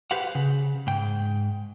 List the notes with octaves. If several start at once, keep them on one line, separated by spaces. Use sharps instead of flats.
G4 B4 C5 F5 F#5
C#3
G#2 G5